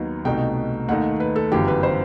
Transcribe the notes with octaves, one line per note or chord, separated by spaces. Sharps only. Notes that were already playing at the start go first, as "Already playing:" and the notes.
Already playing: D#2 D#3 F#3 B3 D#4
C2 B2 A3 D#4 G5
D#2 D#3 A3 D#4 F#5
B4
A4
G1 F#2 E3 G4
B4
C5